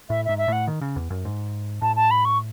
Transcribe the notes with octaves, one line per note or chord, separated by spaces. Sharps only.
A2 E5
G#2 E5
E5
A2 F#5
D#3
C#3
E2
F#2
G#2
A2 A5
A5
B5
C#6